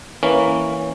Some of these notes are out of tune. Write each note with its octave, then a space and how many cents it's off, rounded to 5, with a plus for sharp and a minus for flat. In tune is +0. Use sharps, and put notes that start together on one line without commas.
E3 -10 A#3 +0 C#4 +0